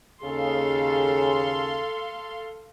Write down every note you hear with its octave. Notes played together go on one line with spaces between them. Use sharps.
D#2 C#3 G#4 A4 F5 C6